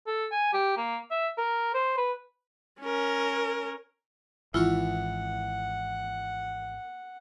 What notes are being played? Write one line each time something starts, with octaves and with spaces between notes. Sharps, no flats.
A4
G#5
G4
A#3
E5
A#4
C5
B4
C#4 A#4
G#1 E3 B3 E4 F4 F#5 C#6